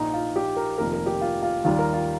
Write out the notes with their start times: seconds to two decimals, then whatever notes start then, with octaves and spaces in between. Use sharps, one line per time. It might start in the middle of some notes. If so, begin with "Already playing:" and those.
Already playing: A#1 A#2 F3 D#4
0.14 F4
0.36 G4
0.57 A#4
0.78 F1 F2 D#3 A#3 A#4
0.93 A#4
1.06 G4
1.21 F4
1.43 F4
1.64 D#2 D#3 G3 F4
1.79 A#4
1.94 F4